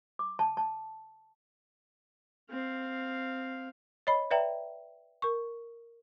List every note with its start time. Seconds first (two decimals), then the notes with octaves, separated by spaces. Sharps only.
0.19 D6
0.39 A5
0.57 A5
2.50 C4 F5
4.07 C#5 D#5 B5
4.31 B4 D5 E5 G5 A#5
5.22 A#4 C#6